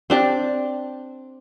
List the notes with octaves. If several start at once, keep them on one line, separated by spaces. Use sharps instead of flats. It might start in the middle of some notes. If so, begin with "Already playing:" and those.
C4 D4 G4